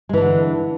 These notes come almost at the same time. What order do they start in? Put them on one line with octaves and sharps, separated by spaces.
G#3 E3 D4 D3